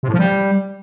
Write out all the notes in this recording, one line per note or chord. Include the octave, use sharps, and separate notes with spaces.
C3
A2
F3
G3